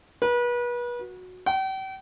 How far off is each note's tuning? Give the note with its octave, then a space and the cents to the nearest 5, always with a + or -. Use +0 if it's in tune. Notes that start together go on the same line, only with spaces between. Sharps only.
B4 -35
F#4 -15
G5 -40